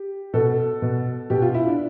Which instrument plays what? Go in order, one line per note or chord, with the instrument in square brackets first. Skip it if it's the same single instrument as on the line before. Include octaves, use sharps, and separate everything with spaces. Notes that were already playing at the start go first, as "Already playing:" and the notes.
Already playing: [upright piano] G4
B2 A4
B2
B2 G4
F4
E4
D4